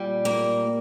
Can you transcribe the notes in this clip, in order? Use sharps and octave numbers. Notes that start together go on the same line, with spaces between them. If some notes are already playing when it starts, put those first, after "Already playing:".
Already playing: A#2 G3
A#3